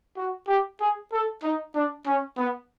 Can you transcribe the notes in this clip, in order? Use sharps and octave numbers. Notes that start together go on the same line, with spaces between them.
F#4
G4
G#4
A4
D#4
D4
C#4
B3